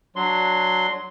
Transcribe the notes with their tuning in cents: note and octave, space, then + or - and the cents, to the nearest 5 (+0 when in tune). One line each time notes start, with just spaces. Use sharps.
F#3 +0 D4 +0 C6 +0